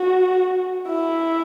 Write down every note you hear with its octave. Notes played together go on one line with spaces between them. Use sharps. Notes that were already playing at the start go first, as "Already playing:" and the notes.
Already playing: F#4
E4